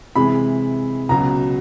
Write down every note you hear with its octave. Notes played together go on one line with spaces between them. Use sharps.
C3 E3 G#3 B5
C#2 B2 F#3 A#5